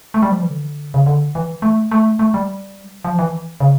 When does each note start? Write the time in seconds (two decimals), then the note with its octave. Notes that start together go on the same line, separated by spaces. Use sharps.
0.14 A3
0.22 G3
0.32 F3
0.41 E3
0.49 D3
0.94 C#3
1.06 D3
1.35 E3
1.62 A3
1.91 A3
2.19 A3
2.34 G3
3.05 F3
3.19 E3
3.60 C#3